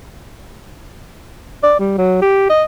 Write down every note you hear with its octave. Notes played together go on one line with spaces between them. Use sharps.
D5
G3
F#3
G4
D#5